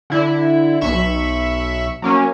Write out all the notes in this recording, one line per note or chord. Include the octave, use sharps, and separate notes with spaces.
D3 E4
B1 E5 B5 C#6 E7
F#3 A#3 C#4